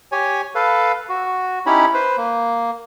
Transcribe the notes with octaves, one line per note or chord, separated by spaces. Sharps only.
G4 C#5 G#5
A4 B4 F5
F#4
C#4 D#4 E4 G4 C#5 B5
B4 C5
A#3